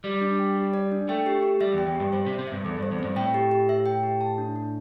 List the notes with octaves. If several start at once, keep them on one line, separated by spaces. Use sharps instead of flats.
G3 D5
D4
G5
G4
D5
D4
A3 G5
G4
G4
G3 E5
E2
G5
E2
G2 G4
G2 C5
C3
C4
C3
G2 E5
E2 A4
G2 C5
E2
C4
G2
A2 G5
G4
G4
E5
G5
G4
A5
D4
D4